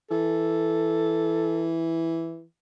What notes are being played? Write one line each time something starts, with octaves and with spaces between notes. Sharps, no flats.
E3 A4